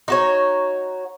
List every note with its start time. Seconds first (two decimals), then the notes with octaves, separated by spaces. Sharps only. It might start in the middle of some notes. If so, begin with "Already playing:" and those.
0.08 D#4 F#4 C#5